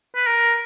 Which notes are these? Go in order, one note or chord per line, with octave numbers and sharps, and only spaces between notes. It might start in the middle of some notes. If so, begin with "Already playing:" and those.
B4
A#4